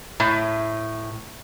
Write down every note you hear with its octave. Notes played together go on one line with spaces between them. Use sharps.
A2